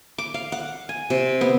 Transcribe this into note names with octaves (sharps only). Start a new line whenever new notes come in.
D6
F5
F#5
G#5
C3
B3